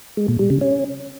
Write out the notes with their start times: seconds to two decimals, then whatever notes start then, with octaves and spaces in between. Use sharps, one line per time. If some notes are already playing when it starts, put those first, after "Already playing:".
0.17 G#3
0.28 A#2
0.39 G3
0.50 C#3
0.61 C#4